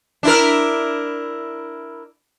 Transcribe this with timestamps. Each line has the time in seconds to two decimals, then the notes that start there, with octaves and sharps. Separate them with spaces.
0.23 D4 E4 A#4